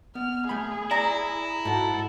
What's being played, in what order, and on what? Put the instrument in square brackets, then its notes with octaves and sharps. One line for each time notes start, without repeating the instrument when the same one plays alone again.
[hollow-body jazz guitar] B3 [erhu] F6
[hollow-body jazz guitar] A3 B5 [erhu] G#4
[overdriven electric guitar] E4 [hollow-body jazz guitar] D5 [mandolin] A#5
[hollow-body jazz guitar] G#2 F#4 [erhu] A4